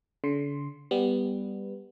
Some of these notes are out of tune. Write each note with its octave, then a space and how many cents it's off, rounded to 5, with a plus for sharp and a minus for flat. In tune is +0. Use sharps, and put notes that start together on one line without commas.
D3 -45 C6 +0
G3 +10 B3 +0 B4 +0